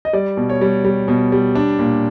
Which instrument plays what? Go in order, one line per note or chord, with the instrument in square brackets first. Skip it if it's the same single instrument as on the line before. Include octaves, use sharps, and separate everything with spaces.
[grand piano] D#5
G3 D5
B2
C#5
G3
G3
B2
G3
D4
A#2